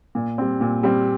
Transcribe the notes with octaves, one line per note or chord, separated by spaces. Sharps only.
A#2
G3 C4
A#2
G3 C4